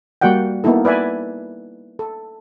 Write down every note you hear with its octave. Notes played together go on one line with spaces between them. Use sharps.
G3 A#3 F#4 D5 F#5 G5
A#3 B3 D#4 E4 A4
B4 D5 E5 G#5
A4